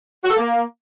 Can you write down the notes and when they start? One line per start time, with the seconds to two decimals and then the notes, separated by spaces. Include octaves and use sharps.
0.24 F#4
0.30 A4
0.37 A#3